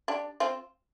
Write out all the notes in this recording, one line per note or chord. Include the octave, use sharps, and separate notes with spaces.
D4 G4
C4 F4